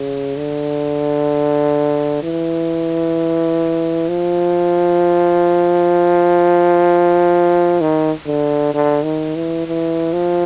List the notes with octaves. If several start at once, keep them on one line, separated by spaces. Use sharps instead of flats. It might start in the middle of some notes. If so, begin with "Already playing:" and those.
Already playing: C#3
D3
E3
F3
D#3
D3
D3
D#3
E3
E3
F3